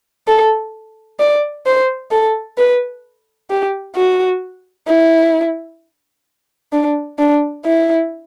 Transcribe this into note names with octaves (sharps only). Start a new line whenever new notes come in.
A4
D5
C5
A4
B4
G4
F#4
E4
D4
D4
E4